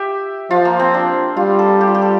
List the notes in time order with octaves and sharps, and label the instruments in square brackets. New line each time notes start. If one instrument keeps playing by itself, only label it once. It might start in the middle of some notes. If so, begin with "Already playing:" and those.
Already playing: [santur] G4 E5
[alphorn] F3 [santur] F4
[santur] A#3
C4
D4
[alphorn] G3 [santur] F4
[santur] A4
G4
F4
G4
A4